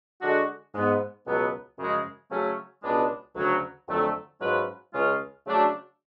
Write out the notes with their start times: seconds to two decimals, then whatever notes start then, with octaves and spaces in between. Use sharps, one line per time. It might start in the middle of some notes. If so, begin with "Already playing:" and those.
0.21 D3 G#3 D4 F#4
0.73 G#2 G#3 B3
1.26 C#2 B2 F#3 B3
1.78 F#2 C#3 F3 G#3
2.30 C#3 F#3 A3 C#4
2.83 C#2 B2 G#3 B3 D4
3.35 D2 C#3 F#3
3.88 F2 D3 F#3 A3
4.40 G#2 F#3 C#4 F4 B4
4.93 C#2 C#3 G#3 C#4 F4
5.45 C#3 F#3 A3 D4 F#4